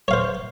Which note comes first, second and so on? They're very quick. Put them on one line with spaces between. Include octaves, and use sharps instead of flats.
C#5 F5 C5